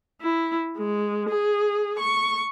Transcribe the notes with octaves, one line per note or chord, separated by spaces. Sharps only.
E4
G#3
G#4
C#6